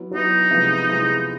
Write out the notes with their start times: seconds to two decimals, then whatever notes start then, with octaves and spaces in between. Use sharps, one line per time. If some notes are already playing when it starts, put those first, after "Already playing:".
Already playing: F#3 B3 E4
0.12 F#3 B3 D#4 E4
0.50 C3 F3 G#3 B3 E4
0.89 C3 F3 G#3 B3 E4